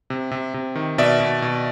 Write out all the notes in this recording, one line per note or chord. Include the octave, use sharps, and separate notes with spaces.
C3
C3
C3
D#3
B2 D5 E5
B2
B2